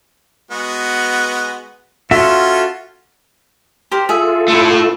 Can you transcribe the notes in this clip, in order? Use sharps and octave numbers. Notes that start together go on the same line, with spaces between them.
G#3 B3 F#4
C#4 F4 F#4 A4 E5 C6
G4 A#4 C5
F4 G#4 A4 E5
A3 E4